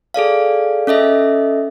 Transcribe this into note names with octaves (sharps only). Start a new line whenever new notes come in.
G#4 A4 D5 F5
C#4 A4 D#5 E5